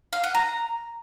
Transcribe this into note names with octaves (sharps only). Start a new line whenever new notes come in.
F5
F#5
A#5